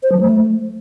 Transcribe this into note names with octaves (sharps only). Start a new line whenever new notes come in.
C5
F#3
A3